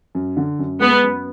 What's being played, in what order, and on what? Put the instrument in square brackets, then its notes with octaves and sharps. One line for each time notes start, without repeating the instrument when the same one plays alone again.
[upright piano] F#2
D3
F#2
[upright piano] G#3 [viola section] B3
[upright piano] F#2